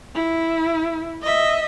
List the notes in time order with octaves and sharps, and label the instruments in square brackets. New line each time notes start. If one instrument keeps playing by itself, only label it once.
[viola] E4
D#5 E5